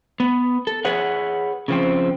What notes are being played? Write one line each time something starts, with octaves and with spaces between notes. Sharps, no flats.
B3
A4
G#4 B4 C#5 F#5
C#3 F3 C4